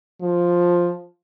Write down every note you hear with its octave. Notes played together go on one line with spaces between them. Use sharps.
F3